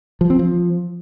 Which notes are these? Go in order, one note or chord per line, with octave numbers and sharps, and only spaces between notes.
F3
C4
F3